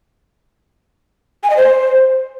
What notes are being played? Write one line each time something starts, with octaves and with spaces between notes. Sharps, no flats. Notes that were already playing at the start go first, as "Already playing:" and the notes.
G#5
D#5
C5